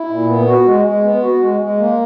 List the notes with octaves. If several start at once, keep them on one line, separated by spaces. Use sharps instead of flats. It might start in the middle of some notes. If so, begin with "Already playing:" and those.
Already playing: E4
A#2
B3
F#4
G#3
G#3
B3
F#4
G#3
G#3
A#3